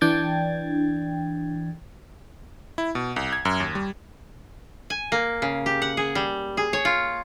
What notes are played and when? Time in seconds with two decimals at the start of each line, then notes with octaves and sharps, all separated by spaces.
0.01 E3 D4 G5 G#6 A6
2.78 E4
2.95 B2
3.16 C2
3.33 G#6
3.45 F#2
3.60 D#2
3.75 G3
4.90 G#5
5.12 A#3
5.42 C#3
5.66 G4
5.82 F#5
5.97 G#4
6.15 G3
6.57 G#4
6.73 C#5
6.85 F4